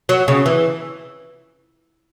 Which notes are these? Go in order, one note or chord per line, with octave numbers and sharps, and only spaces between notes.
F#3
C#3
E3